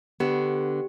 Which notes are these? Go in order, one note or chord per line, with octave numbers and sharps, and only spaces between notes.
D3 B3 G4